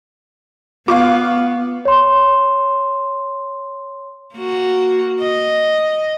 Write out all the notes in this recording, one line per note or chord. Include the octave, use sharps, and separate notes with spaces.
B3 F4 F5 C#6 D6
C#5 C6
A#3 F#4
D#5